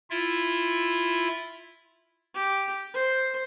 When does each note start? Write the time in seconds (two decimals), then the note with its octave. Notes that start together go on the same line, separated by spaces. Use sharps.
0.10 E4 F4 E5
2.34 G4
2.94 C5